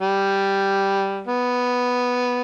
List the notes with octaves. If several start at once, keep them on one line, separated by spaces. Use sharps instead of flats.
G3
B3